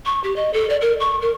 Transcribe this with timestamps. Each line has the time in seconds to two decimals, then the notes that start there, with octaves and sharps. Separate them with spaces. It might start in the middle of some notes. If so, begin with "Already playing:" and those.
0.06 C#6
0.24 G4
0.36 D#5
0.54 A4
0.70 D5
0.81 A#4
1.00 C#6
1.22 A#4